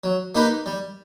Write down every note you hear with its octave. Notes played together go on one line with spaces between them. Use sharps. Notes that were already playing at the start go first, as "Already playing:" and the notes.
F#3
A#3 D#4 G4 B4
G3